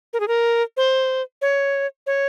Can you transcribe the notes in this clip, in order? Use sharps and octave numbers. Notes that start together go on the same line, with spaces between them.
A#4
G#4
A#4
C5
C#5
C#5